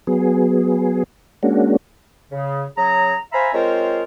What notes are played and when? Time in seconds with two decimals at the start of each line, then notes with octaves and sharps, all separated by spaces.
0.07 F#3 B3 G#4
1.43 G#3 A#3 C#4 D4 F#4
2.31 C#3
2.77 C#3 F#3 G#4 A#5
3.32 C5 E5 F5 G#5 A#5 B5
3.52 G#3 C4 F4 A#4 C5 C#5